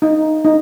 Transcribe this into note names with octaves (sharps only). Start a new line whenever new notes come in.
D#4
D#4